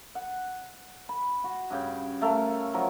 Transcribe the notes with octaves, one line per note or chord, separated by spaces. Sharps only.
F#5
B5
F#4
G2 C#3 G5
A3 A4 A#4 F5
F3 F#3 A#4